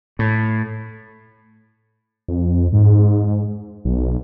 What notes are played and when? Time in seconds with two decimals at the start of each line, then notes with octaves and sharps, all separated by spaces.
0.19 A2
2.28 F2
2.72 G#2
3.85 B1